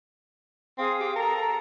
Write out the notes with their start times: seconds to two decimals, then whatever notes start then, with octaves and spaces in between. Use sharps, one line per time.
0.78 C4 G#4 F5 D#6
1.01 G4
1.16 A4 A#4 A#5